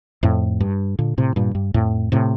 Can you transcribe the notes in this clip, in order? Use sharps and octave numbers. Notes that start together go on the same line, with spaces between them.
F2 A2
G2
A#2 D3
A2 C3
G2 A#2
G2
F2 A2
A2 C3